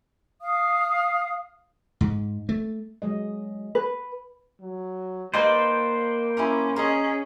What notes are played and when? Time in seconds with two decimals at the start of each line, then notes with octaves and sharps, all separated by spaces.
0.41 F5 D#6
2.01 G#2
2.49 A3
3.02 F#3 G#3 D#5
3.75 B4
4.61 F#3
5.34 A#3 D#4 B4 C5 D5 F5 G5
6.37 C#4 E4 G#4 A#4
6.76 C#4 G#4 A#4 C#5 D#5